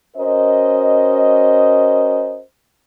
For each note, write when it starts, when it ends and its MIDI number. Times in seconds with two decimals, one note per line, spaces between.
0.16 2.41 61
0.16 2.41 66
0.16 2.41 70
0.16 2.41 72
0.16 2.41 75